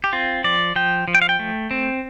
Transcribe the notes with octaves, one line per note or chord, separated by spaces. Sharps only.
G4
C4 F4
F3 D5
F3 G5
F3
G5
F5
G5
A3
C4